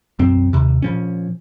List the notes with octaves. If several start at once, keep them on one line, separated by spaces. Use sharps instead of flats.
B1 F#2 C4
D#2 C3
A#2 F3 C#4